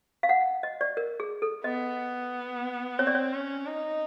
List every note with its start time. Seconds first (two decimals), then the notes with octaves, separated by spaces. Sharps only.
0.23 F5
0.29 F#5
0.63 D#5
0.81 D5
0.97 A#4
1.20 G#4
1.42 A4
1.64 B3 D#5
2.98 C4 C#5
3.07 D5
3.15 C#5
3.33 C#4
3.67 D#4